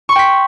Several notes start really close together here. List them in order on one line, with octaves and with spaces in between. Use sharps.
C#6 C6 G5 B6